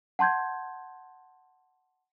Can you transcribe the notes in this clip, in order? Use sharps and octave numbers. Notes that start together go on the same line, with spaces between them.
F#5 A5 C6 G6 G#6